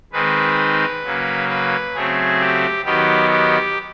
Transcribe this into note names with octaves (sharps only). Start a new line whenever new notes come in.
D#3 G#3 C4 D#4 B4
C#3 F#3 A#3
B4
C#3 F#3 A3 C4 G#4
G4
D#3 F#3 B3 D#4 G4
G4